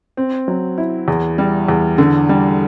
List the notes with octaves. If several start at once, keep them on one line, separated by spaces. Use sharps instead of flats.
C4
F#3
E4
E2
G3
E2
D3
G3